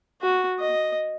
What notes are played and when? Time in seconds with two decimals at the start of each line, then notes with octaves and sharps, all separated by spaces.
0.22 F#4
0.59 D#5